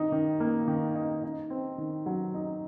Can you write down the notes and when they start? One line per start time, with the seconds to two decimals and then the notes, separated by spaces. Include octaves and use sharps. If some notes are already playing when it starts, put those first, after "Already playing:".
Already playing: D#3 D#4
0.12 D#3
0.40 A#3
0.68 D#3
0.95 D#4
1.24 D#4
1.50 C4
1.78 D#3
2.06 F#3
2.34 D#4